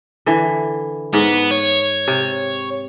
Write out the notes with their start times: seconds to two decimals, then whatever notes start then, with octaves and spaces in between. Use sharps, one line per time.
0.26 D3 E3
1.13 G#2 B3
1.51 C#5
2.08 C3